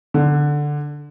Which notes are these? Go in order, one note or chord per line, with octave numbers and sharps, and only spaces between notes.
D3